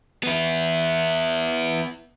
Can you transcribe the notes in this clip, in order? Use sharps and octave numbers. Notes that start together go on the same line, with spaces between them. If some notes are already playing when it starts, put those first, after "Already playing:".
B3 E4